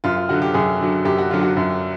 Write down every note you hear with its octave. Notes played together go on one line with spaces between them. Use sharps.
F#2 F4
F4
D3 F#3 F#4
G4
F#2 G#4
D3 F#3
F#2 G4
F#4
D3 F#3 F4
F#4
F#2